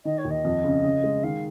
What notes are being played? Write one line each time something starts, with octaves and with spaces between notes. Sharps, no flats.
D#3 D#5
C#5
D#2
D#5
F2
C#3
C#3
G#3
D#3 F5